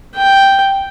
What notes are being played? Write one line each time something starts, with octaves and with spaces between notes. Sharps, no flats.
G5